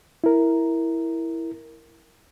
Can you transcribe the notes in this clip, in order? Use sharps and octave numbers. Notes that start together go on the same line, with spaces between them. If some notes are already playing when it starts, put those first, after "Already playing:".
E4 A#4